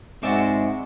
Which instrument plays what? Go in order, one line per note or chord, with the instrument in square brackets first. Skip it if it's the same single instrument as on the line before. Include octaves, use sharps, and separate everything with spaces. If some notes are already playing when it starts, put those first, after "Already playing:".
[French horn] G#2 [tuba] G#3 [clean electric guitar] C4 C5 E5 [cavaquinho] F#4 D5 D6